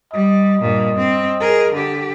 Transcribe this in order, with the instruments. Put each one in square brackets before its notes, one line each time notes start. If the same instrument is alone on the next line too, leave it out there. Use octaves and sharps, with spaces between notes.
[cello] G3 [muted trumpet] D#5
[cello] G2 A#2
C4
G#4 A#4
D3 G4